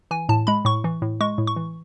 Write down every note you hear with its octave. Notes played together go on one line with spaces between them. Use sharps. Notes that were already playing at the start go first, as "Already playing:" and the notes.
E3 G#5
A2 A5
G#3 B5
A2 C#6
E3
A2
G#3 C#6
A2
C#6
E3